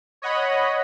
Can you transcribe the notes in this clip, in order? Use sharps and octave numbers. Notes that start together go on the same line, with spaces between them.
C#5 D#5 F#5 B5